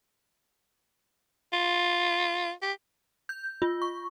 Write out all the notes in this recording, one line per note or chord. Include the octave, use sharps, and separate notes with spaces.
F4
G4
G6
F4
C#6